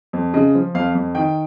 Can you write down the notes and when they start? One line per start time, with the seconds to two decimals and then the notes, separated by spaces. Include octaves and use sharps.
0.13 F2
0.34 C#3 D#5
0.55 F3
0.75 F2 F5
0.95 F2
1.15 D#3 G5